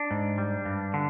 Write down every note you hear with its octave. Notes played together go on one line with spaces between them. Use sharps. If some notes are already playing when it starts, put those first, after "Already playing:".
Already playing: D4
G#2
G3
G2
D3